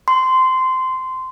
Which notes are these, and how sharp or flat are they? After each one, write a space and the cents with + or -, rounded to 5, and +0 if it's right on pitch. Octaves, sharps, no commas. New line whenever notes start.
C6 -15